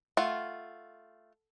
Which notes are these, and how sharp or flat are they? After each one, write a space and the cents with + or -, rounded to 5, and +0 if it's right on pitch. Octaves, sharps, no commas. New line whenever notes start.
A3 +0 F4 +0 F#5 +0